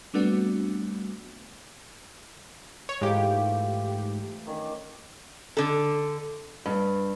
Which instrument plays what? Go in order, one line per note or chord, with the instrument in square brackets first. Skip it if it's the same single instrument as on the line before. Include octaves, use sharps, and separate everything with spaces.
[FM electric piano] G3 A3 B3 C4 D4 F#4
[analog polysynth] C#5
[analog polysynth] G#2 G4 [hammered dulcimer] E3 A3 F4
[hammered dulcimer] D#3 C#4 D4
[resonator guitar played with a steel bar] D3 A4
[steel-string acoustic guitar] G2